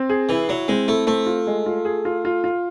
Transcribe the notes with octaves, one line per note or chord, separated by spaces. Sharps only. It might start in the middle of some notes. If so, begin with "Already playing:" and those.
Already playing: C4
G#4
E3 E4
F#3 E4
G#3 C4
A3 E4
A3 C4
F4
G#3
F4
G#4
F4
F4
F4